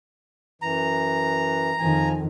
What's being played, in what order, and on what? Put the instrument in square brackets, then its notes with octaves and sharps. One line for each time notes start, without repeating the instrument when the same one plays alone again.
[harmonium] F#2 E3 [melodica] A#5
[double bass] F2 D#3 [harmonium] F3 G#5